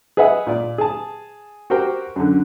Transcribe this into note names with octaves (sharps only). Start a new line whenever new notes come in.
G#4 B4 D#5 E5 F#5
A#2 D5
G#4 A5
F#4 G4 A#4 C5 G5
F#2 D3